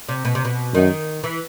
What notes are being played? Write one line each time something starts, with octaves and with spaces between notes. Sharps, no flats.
C3
B2
C3
B2
F#2 D#3
E3